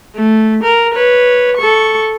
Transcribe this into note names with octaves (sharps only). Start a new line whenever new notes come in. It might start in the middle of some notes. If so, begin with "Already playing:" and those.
A3
A#4
B4 C#5
A4 C#6